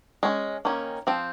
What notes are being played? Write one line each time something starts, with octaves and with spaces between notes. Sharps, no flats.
G#3 C#4
D#3 A#3 C#4
F3 C4